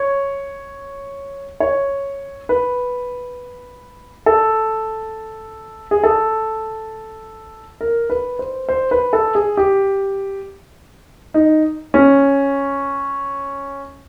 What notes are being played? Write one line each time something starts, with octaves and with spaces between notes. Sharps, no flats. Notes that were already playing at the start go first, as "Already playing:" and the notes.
Already playing: C#5
C#5
B4
A4
G#4
A4
A#4
B4
C5
C5
B4
A4
G#4
G4
D#4
C#4